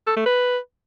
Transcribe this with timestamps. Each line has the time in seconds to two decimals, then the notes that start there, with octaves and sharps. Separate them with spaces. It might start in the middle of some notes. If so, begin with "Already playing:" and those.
0.07 A4
0.16 A3
0.26 B4